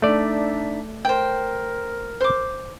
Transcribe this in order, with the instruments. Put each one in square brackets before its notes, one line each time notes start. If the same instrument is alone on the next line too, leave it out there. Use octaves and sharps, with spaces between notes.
[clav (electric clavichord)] A3 D5 [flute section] D4 D#4 E5
[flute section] A#4 [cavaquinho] C5 G5
[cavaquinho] C5 D6